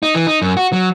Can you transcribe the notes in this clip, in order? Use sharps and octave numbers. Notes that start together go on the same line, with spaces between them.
D#4
E3
D#4
F#2
F#4
F#3